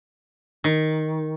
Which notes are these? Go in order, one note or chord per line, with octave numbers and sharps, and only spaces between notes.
D#3